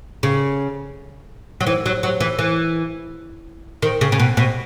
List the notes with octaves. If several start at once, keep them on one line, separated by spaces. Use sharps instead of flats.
C#3
F#3
E3
F#3
F#3
E3
E3
D#3
C#3
C#3
B2
B2